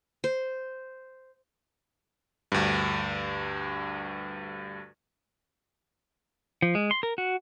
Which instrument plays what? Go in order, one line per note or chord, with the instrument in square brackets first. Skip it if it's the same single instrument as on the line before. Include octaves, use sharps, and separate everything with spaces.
[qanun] C5
[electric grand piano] D2 G2
[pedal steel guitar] F3
G#3
C6
A#4
F#4